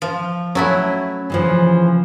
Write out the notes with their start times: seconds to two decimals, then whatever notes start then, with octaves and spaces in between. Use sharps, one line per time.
0.02 F3
0.55 F#3 A3 C#4 E4
1.30 C#3 E3 F3